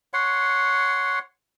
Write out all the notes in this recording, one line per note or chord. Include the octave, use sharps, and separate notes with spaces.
C#5 F#5 C6